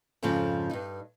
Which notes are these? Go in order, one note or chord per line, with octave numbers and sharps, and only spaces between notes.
F2 G#2 C#3 F3 C4 F4
G2 D#4